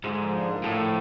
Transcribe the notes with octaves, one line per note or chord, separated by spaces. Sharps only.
G#2 D3
F3
D4
A#3
A2 D3
F3